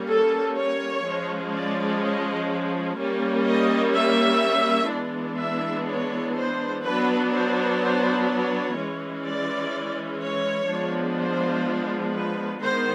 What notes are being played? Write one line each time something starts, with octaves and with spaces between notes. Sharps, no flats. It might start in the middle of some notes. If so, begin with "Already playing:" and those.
Already playing: G3 A#3 C#4
A4
C#5
F3 G#3 C#4
D5
D#5
G3 A#3 C#4
D#5
E5
E3 G#3 B3 D4
E5
C#5
C5
F#3 B3 D4 B4
C5
C5
C#5
E3 G#3 C#4
D5
C#5
F3 G#3 B3 D4
C5
B4
D#3 G#3 B3 C5